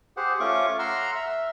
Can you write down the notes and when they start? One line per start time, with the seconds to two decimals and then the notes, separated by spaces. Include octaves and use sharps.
0.17 G4 G#4 C5 F#5
0.40 A3 C#4 F4 C#6 D6
0.79 F#5 A#5 C6 E6 F6
1.15 E5